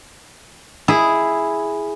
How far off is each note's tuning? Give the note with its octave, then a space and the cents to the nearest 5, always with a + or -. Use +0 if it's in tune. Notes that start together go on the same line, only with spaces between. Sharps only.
E4 +0 G#4 +0